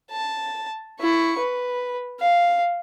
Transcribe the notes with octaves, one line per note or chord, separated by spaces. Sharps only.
A5
E4 C#6
B4
F5